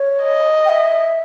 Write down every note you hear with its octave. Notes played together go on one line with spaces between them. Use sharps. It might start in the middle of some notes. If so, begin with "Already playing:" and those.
Already playing: C#5
D#5
G5
E5